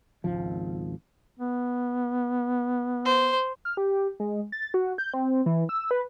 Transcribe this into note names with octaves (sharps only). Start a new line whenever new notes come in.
G#1 C#2 F3
B3
C5
F6
G4
G#3
A6
F#4
G6
C4
E3
E6
B4